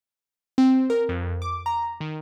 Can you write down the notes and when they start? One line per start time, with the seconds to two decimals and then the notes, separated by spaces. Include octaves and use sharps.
0.58 C4
0.90 A#4
1.09 F2
1.42 D6
1.66 A#5
2.00 D#3